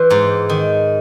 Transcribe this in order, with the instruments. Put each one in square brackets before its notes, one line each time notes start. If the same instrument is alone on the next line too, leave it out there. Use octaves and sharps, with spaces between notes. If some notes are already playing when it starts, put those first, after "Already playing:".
Already playing: [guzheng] E3 C5
G#2
D#3